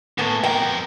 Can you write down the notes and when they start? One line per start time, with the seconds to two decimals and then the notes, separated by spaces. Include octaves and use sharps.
0.18 A2 A#3 B3 G#5
0.44 F2 A#4 G5